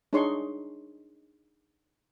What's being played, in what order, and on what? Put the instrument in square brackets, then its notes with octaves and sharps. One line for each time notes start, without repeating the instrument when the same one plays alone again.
[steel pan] D4 D#4 G#4 C#5 C6 C#6